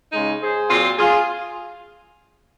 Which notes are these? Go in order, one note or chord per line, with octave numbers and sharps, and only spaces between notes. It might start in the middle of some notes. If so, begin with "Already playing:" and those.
C#3 G#3 D#4
G#4 C5
A#2 F#3 C4 F4
F4 G#4